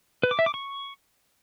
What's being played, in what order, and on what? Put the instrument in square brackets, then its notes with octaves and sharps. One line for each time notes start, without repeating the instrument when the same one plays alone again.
[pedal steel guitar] B4
D6
E5
D6
C#6